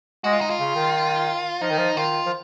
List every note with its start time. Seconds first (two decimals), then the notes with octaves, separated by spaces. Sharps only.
0.24 G#3 F#4
0.33 F4
0.41 G#3 D#4
0.50 F4
0.59 C#3
0.75 D#3
1.61 F3 D#4
1.70 D#3
1.78 F3
1.96 D#3 F4
2.26 F3